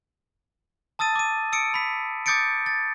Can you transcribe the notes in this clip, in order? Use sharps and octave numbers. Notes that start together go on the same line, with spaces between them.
A5 D#6 E6 A6 D#7
D6 D#7
D#6 E6 C#7 D7
B5 B6
D6 D#6 G6 A6 C#7 D7
A6